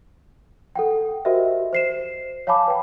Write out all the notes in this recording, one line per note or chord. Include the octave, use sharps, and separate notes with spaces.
A4 F#5 G5
F#4 G4 A#4 C5 D#5 E5
C5 C7 E7
C#5 F5 G#5 A5 B5 D6
B4 G5